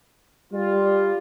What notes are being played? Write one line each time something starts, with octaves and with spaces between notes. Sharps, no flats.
G3 F4